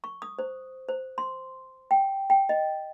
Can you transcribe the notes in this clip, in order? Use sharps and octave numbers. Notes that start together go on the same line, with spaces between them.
C#6
D#6
C5
C5
C6
G5
G5
D#5